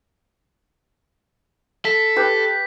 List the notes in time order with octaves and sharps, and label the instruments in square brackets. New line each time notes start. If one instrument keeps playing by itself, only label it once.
[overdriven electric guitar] A4 [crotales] B6
[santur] G4 B4